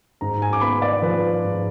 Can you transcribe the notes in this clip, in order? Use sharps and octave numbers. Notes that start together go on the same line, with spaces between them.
G#2 A#5
G#5
D6
B3 B5
D5
F3 B4
G#2